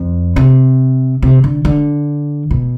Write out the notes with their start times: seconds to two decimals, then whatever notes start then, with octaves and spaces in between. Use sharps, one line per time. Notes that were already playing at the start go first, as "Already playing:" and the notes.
Already playing: F2
0.36 C3
1.22 C3
1.44 D3
1.65 D3
2.51 B2